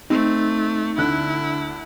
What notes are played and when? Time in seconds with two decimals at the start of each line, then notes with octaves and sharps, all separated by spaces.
0.10 A3 C4 D#4
0.98 D2 D3 E4 F#6